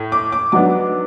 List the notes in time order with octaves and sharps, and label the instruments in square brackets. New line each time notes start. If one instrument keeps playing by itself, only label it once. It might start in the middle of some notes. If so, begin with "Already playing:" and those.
Already playing: [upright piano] A2
D6
D6
G#2 F#3 B3 D4 D6